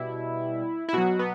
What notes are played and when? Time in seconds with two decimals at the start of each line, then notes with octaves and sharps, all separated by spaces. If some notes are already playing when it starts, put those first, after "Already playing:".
Already playing: B2 G3 E4
0.89 E4
0.93 B2 F#3 F#4
1.19 B3